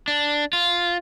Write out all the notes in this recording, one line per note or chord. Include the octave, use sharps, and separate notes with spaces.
D4
F4